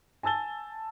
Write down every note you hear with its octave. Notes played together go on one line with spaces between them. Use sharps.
G#5 A5 E6 A6 G7